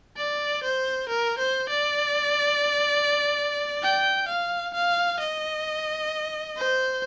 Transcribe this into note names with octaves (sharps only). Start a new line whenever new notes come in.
D5
C5
A#4
C5
D5
G5
F5
F5
D#5
C5